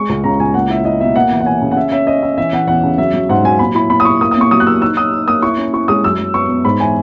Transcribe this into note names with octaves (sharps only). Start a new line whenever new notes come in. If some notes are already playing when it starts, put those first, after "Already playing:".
Already playing: G#3 C#6
C#2
C#3 A#5
C#2 G#5
A#3 F#5
E4 E5
E4 D#5
B2 E5
A#3 F#5
E3
F#5
E3 G#5
C#3
F#5
C#4 E5
C#4 E5
C#4 D#5
C#4 E5
E3 E5
E3 F#5
E2 F#5
C#3
F#3 E5
F#3
G#2 F#5
F#3 G#5
A#2 B5
E4 B5
A#2 B5
D#6
E4 C#6
A#3 D#6
D#6
A#2 C#6
F#3 D#6
F#6
A#3 E6
D#4 E6
D#4 D#6
D#4
A#3 D#6
E4 C#6
C#4
E4 C#6
G#3 D#6
F#2 E6
F#2
B3 C#6
B3
G#2 B5
E3 G#5